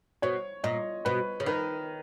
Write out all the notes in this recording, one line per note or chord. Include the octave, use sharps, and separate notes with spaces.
B2 C#5
A#2 D#5
B2 B4
C#3
D#3 B4